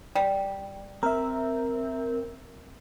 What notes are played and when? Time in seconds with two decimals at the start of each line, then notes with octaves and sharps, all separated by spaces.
0.15 G3
1.03 C4 A#4 E5